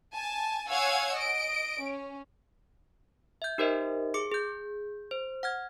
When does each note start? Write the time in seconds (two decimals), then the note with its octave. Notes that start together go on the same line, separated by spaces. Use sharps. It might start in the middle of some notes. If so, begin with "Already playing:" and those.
0.14 G#5 A5
0.69 C#5 F5 F#5 G#5 E6 G#6
1.15 D#5 D7
1.82 C#4
3.42 E5 G6
3.58 D#4 G4 A#4 C5 D#5 E5
4.14 G#4 D6 C#7
4.32 G#4 G6
5.11 C5
5.43 F#5 F6 G#6